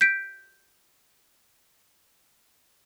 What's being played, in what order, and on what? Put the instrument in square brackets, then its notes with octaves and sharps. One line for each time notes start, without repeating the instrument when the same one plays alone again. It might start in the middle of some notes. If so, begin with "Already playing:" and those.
[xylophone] G6 B6 D7